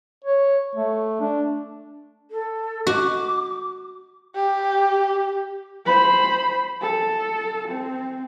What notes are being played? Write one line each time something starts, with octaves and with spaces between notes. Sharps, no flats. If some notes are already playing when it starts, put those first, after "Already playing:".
C#5
A3
D4
A4
F#4 D6
G4
C5 B5
A4
C4